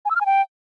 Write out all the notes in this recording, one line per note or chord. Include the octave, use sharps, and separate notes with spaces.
G#5
E6
F6
G#5
G5